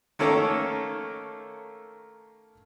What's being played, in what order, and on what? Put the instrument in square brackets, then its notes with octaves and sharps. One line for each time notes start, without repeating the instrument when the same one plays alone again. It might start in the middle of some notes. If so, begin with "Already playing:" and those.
[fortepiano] D#3 A3 A#3 C#4 A4 A#4